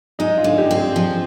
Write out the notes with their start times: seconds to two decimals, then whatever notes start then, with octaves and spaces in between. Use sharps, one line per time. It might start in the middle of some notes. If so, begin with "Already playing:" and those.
0.19 G#3 D#4
0.38 F4
0.44 D3
0.58 G4
0.71 C4
0.77 G#4
0.96 F3